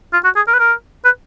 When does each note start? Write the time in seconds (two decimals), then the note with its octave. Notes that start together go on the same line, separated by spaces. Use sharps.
0.13 F4
0.24 F#4
0.36 G#4
0.48 A#4
0.53 B4
0.59 A#4
1.05 B4